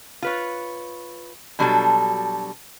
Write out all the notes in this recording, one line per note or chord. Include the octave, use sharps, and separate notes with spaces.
F4 B4 C#5
B2 F#3 G3 D4 F4 A4